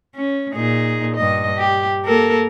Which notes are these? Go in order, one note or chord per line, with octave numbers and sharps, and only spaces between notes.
C#4
A#2 D#4 G#4
G2 D#5
G4
A#3 A4 A#4